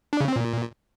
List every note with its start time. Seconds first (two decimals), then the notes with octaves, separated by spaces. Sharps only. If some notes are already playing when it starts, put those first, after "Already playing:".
0.13 D4
0.20 C#3
0.28 C4
0.36 A#2